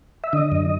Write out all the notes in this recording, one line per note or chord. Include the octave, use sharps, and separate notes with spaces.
E5
D3 D#5
F#2